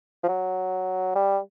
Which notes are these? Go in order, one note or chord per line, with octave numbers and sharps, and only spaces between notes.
F3
F#3
G3